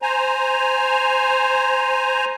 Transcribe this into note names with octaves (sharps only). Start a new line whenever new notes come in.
C5 G#5 A#5